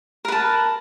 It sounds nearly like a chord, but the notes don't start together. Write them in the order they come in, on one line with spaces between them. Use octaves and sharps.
A#4 B4 A5